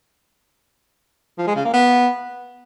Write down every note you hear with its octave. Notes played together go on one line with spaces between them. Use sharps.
F3
G#3
C#3
A#3
B3